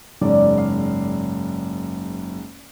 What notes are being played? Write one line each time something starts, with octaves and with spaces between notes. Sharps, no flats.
F#1 G#2 D5
F5